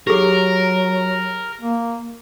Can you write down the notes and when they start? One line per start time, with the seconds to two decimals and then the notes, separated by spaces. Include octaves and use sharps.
0.07 F#3 G4 G#4 A#4
1.61 A#3